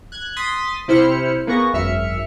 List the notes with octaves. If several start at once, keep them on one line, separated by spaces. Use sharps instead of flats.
F#6 G#6
C6 D#6 A6 B6
C3 E4 C5 B5 F6 C#7
A#3 B3 G#4 C#6 A#6
G#1 F#2 E5 F6 C#7